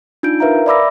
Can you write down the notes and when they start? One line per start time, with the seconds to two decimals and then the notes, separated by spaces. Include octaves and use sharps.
0.23 D4 D#4 F4 G6 D7
0.40 A#4 B4 E5 F5 A#5
0.66 D5 E5 B5 D6 E6 A#6